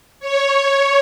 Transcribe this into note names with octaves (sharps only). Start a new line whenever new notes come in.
C#5